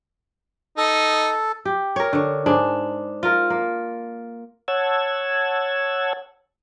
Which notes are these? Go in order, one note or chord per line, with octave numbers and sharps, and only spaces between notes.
D#4 A4
G4
A#4 C#5
D3 C#5
G#2 D4 G#4
F4 A#4
A#3
C#5 F#5 A5 E6 G#6